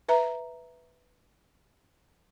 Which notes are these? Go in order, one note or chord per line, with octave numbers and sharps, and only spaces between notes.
B4 E5 A#5